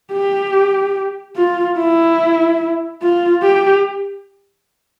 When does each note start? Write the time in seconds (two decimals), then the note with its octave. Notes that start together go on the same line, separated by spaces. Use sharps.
0.12 G4
1.36 F4
1.77 E4
3.02 F4
3.43 G4